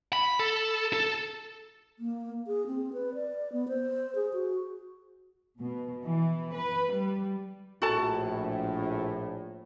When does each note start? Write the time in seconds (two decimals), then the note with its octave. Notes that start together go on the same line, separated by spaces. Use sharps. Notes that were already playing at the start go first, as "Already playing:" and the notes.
0.13 B5
0.40 A4
0.93 A4
1.99 A#3
2.47 G#4
2.67 C4
2.93 B4
3.15 D5
3.53 B3
3.68 C5
4.15 G#4
4.34 F#4
5.60 B2
6.04 E3
6.55 B4
6.93 G3
7.82 A#1 A2 F#4 A4 A5